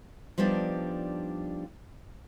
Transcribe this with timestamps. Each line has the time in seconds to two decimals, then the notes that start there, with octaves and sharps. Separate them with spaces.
0.38 F3 G3 B3 D4 D#4